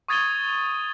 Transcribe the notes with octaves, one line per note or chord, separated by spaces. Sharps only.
C#6 D#6 G#6 A6 D#7 G7